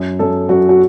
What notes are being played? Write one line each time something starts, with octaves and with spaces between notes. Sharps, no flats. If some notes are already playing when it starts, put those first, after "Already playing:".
Already playing: F#2
F#2 A4
F#2 F#4
F#4